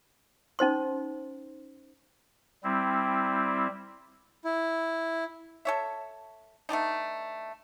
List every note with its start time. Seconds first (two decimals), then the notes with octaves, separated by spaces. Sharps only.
0.59 C#4 D#4 C5 C6
2.64 G3 C4 E4
4.45 E4
5.65 A4 C#5 E5
6.69 A3 B3 D4 D#4